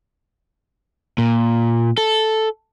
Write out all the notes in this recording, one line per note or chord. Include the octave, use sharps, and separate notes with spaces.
A#2
A4